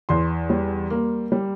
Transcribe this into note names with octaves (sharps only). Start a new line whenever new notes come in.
E2 C6
G3
A#3
G3